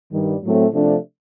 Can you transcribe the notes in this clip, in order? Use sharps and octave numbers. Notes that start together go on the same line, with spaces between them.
G2 D#3 G3
A2 F#3 A3 C4
C3 F3 A3 D4